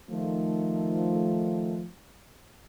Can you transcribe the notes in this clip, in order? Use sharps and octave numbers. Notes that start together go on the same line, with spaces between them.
D#3 F3 A3